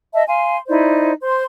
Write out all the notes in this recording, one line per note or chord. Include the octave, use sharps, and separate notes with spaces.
D#5 E5 A5
F5 G#5 C6
D#4 E4 C5 D5
C5 C6